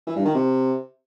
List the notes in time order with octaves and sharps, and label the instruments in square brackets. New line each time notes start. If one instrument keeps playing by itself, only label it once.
[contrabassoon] E3
G2
D#3
C3